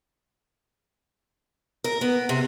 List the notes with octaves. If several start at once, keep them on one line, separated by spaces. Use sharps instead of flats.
A#4
B3
C3